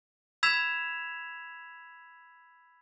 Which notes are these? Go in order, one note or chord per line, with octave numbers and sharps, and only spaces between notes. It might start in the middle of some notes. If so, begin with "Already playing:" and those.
B5 E6 G#6 B6 E7 F7